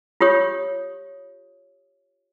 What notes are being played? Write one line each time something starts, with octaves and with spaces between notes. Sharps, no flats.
F4 G4 C#5 D#6